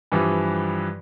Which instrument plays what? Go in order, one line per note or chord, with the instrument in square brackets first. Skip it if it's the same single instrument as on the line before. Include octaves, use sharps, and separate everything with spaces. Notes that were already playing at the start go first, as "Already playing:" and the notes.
[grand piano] G2 E3 F3 G3